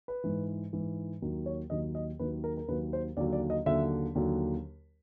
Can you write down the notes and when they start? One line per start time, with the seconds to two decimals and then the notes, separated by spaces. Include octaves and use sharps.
0.08 B4
0.24 G#2 E3
0.73 G#2 E3
1.22 D#2 D#3 F#3
1.46 C#5
1.70 D#2 D#3 F#3 D#5
1.95 D#5
2.19 D#2 D#3 F#3 B4
2.44 A#4
2.57 A#4
2.68 D#2 D#3 F#3 B4
2.93 C5
3.17 D#2 D3 F#3 D5
3.33 D5
3.50 D#5
3.66 D#2 D3 F#3 E5
4.15 D#2 D3 F#3